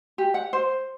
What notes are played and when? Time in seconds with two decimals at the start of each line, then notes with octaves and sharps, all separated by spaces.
0.18 G4
0.34 F#5
0.53 C5